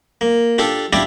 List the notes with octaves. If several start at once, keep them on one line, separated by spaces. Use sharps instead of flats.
A#3
D4 F4 G4 A4
D4 E4 F4 G4 D5